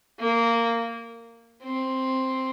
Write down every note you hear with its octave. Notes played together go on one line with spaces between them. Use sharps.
A#3
C4